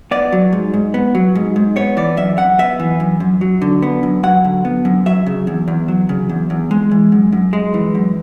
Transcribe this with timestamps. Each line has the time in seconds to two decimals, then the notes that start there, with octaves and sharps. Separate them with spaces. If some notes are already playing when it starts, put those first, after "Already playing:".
0.11 B3 D5
0.32 F#3
0.53 G#2
0.74 G#2
0.94 B3
1.15 F#3
1.35 G#2
1.56 G#2
1.76 B3 C#5
1.97 E3 D5
2.17 F#2 E5
2.38 F#2 F#5
2.58 B3 E5
2.80 E3
3.00 F#2
3.20 F#2
3.41 F#3
3.62 D3
3.82 B3
4.03 F#2
4.23 F#3 F#5
4.44 D3
4.65 B3
4.85 F#2
5.06 F#3 E5
5.26 C#3
5.47 E2
5.68 E2
5.88 F#3
6.09 C#3
6.29 E2
6.50 E2
6.71 G#3
6.91 E3
7.12 F#2
7.32 F#2
7.53 G#3
7.74 E3
7.95 F#2